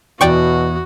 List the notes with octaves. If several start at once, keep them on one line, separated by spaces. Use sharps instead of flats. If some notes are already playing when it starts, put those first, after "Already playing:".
E2 B2 F#4 D5 G5 C#6